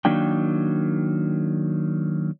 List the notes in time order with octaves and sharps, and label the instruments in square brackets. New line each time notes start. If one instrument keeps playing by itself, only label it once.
[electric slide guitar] D#3 F#3 A#3 D4 G5